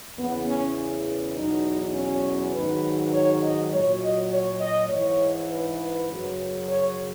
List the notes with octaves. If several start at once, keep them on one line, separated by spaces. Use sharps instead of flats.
E2 C#3 E3 B3
C#4
E2 B2 F#3 D#4
C#4
G#2 D#3 F#3 B4
C#5
D#5
A#2 F#3 C#5
D#5
C#5
D#5
G#2 E3 C#5
B4
F#2 C#3 F#3
C#5